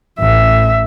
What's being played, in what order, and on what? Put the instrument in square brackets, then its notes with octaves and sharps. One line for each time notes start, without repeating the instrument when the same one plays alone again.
[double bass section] A1 [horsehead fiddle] E5